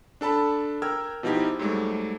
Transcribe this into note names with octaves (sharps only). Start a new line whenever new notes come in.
D4 A4 A5 B5
A#4 G5 E6 F6 G#6
B2 F3 D#4 E4 G4
G#2 F#3 G3 A3